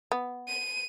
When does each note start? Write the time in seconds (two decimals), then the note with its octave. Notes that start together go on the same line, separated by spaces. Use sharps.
0.12 B3
0.48 D#7